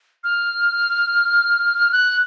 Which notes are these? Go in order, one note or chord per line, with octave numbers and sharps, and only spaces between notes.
F6
F#6